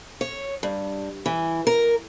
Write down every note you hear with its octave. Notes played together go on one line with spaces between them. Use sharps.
C#5
G2
E3
A#4